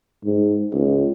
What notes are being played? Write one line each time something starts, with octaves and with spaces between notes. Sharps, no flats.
G#2
C#2